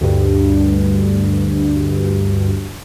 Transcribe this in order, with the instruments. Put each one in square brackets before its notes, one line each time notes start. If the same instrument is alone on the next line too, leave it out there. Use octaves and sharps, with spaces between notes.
[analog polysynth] D2 G2